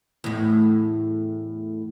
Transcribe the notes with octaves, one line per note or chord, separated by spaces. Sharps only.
E2 A2